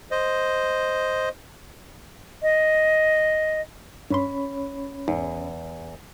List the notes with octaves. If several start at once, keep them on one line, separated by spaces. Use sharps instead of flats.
C5 D#5
D#5
G2 C#4 C#5 B5 C6
E2 G#2